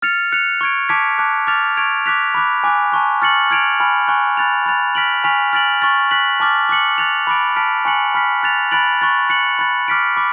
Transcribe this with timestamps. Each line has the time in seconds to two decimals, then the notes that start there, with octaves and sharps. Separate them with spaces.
0.02 F6 A6 C#7 F7
0.32 F#6 C#7 F7
0.61 C#6 G#6 D7
0.89 A5 D6 G#6 B6 D7
1.18 A5 D6 F#6
1.47 D6 F6 A6 F7
1.77 C#6 G#6 D7 F7
2.06 D6 F#6 B6 F7
2.34 B5 D6 F#6
2.64 G#5 D6 F#6
2.92 A5 C#6 F#6
3.22 C#6 F6 A6 C#7 F#7
3.50 F6 G#6 D7 F7
3.80 G#5 B5 F6
4.08 G#5 C#6 F#6
4.37 B5 F#6 A6 F7
4.66 B5 F#6 A6 F7
4.95 F6 B6 D7 F#7
5.24 G#5 C#6 F6 B6 F7
5.53 F6 A6 D7 F#7
5.82 C#6 F6 A6
6.11 F#6 B6 F#7
6.40 A5 D6 F6 A6
6.69 D6 F#6 C#7 F#7
6.98 F#6 A6 F7
7.27 B5 D6 F#6 A6 D7
7.56 A5 F6 B6 D7
7.85 G#5 C#6 F#6 C#7 F#7
8.14 B5 F6 B6
8.43 F#6 A6 F7
8.71 B5 F#6 A6 D7 F#7
9.01 C#6 F#6 A6
9.29 F#6 C#7 F#7
9.59 B5 F#6 A6
9.88 D6 F6 B6 D7
10.16 B5 D6